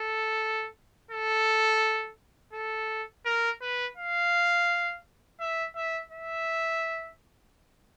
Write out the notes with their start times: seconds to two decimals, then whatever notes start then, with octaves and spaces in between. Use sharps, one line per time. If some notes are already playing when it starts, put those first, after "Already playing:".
Already playing: A4
1.11 A4
2.53 A4
3.25 A#4
3.61 B4
3.97 F5
5.40 E5
5.76 E5
6.11 E5